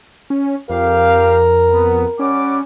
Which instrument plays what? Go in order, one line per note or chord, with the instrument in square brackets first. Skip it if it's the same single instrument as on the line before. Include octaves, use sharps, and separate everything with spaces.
[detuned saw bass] C#4
[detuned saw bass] F2 [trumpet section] G4 F5 [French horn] A#4
[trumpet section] B3
[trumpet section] G3 F#5 D6 [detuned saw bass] C#4